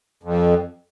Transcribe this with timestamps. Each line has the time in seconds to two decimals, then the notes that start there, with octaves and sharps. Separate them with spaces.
0.23 F2